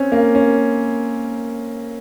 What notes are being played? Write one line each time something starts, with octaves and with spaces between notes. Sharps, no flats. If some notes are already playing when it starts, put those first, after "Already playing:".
Already playing: C4 C#4
A#3
C#4